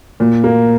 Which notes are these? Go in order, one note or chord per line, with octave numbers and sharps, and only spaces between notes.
A#2
A#3